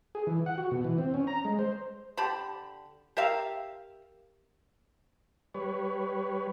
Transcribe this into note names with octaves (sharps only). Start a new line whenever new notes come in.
G#4
E3
F#5
F#4
B2
E3
C4
C#4
A#5
G#3
C5
D3 G4 A5 B5
G4 A#4 E5 F5
G3 B4 C#5